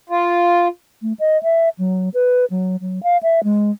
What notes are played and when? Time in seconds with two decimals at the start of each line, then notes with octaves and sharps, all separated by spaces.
0.09 F4
1.01 A3
1.19 D#5
1.43 E5
1.79 F#3
2.14 B4
2.51 F#3
2.81 F#3
3.03 F5
3.23 E5
3.44 G#3